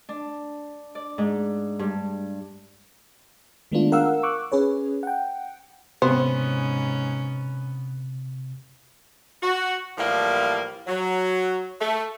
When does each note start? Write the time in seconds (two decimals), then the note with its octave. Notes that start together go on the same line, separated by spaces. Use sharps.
0.09 D4
0.95 D5
1.18 G#2
1.79 G2
3.72 D#3 G#3 A3 B3 D4 F4
3.92 A#4 F5 F#5 E6
4.23 C#6 D6 E6 F#6
4.52 C#4 G#4 B4 C#5
5.03 F#5 G5
6.02 G#2 C3 B3 C#4 C5
9.42 F#4
9.97 A2 E3 F3 G3 A#3
10.87 F#3
11.80 A3